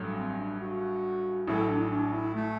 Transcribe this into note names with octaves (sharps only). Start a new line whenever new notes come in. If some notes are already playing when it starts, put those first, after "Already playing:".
Already playing: A1 G2 F#3 A3
C4
D4
F#4
A1 A2 F#3 A3 E4
D4
E4
D4
E4
A3